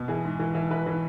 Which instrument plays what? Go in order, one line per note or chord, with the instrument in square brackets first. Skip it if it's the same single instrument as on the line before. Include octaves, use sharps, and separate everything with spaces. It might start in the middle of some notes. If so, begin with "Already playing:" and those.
Already playing: [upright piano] B2
E3 G#4
G#2
E3
E3
E3 B4
E3